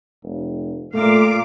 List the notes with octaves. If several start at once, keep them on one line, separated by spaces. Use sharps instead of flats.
F1
A#2 A3 F5 D6